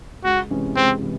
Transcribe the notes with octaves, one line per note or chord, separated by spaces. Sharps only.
C#2 F#4
C3 E3 G#3 C#4
C#2 C4
C3 E3